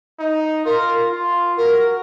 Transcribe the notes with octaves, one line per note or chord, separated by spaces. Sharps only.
D#4
F4 A#4
F4
F#4 A#4